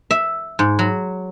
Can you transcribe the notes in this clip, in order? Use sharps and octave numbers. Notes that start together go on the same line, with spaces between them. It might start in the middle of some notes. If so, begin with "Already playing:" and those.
E5
G#2
F#3